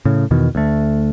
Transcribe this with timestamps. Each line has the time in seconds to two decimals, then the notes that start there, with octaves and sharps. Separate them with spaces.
0.05 A2 C#3
0.31 E2 B2 D#3
0.55 D2 A3